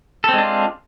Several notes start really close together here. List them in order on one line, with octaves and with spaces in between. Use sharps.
A4 C4 G#3 D4 F4